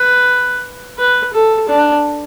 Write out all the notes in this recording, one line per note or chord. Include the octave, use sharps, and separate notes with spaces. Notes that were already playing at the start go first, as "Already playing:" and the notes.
Already playing: B4
B4
A4
D4